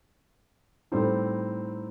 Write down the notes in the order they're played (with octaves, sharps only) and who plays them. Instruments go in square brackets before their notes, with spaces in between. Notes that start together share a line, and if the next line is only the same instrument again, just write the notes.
[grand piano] A2 G3 C4 D#4 A4